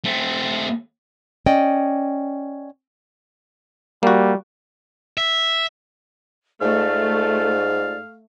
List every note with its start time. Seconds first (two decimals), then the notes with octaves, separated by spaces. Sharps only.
0.05 A3 C4
1.46 C#4 D5 D#5 G5
4.03 G3 A#3 F#4
5.18 E5
6.61 G#2 A3 F4 D5 F5